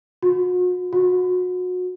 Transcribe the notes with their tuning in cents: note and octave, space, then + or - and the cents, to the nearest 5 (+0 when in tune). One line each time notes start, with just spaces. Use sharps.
F#4 -40
F#4 -30